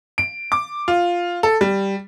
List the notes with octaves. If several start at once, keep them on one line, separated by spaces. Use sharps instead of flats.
D7
D6
F4
A4
G3